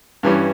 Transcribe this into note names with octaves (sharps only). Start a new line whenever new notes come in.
G2 E3 G3 C#4